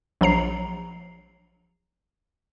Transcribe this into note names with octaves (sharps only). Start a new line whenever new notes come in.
A#1 F#3 A#5 C7